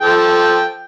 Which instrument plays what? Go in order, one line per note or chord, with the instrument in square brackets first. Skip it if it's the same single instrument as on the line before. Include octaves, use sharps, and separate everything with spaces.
[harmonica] F3 A4 G5